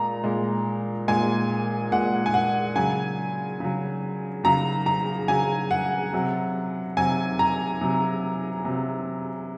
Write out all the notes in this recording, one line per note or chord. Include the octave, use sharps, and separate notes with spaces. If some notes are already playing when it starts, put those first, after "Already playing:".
Already playing: A#2 G#3 A#5
A#2 G#3
A#2 G#3 G#5
A#2 G#3 F#5
G#5
F#5
C#3 F#3 G#5
C#3 F#3
C#3 F#3 A#5
A#5
C#3 F#3 G#5
F#5
C3 F#3
C3 F#3 G#5
A#5
C3 F#3
C3 F#3